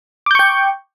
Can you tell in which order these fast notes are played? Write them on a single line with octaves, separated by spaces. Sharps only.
D6 G6 C#6 G5